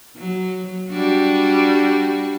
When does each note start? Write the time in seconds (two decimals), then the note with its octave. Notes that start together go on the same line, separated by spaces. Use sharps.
0.16 F#3
0.90 G3 D4 F#4